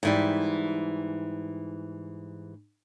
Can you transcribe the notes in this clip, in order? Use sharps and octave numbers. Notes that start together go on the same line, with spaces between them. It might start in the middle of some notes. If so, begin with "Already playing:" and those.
G#2 E3 G3